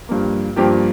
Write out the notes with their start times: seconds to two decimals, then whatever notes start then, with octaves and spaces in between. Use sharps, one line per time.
0.09 G2 F3 A#3
0.56 G2 F3 A#3 G4